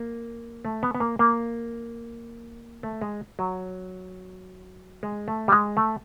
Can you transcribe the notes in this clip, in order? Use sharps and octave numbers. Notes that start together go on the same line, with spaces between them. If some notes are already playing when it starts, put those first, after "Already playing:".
Already playing: A#3
A3
B3
B3
A#3
A#3
A3
G#3
F#3
G#3
A3
G3
G#3
A3